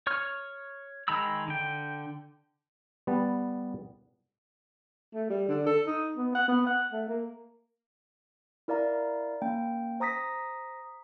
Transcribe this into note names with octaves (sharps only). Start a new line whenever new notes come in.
C#5 C#6 F6
D#3 G#3 A#5 B5 E6
D3 G5
G3 B3 B4 A5
A3
G3
D3
A4
D#4
B3
F#5
B3
F#5
A3
A#3
E4 A#4 D5 F5 A#5
A#3 C#4 G5
C5 A#5 D#6 A#6 B6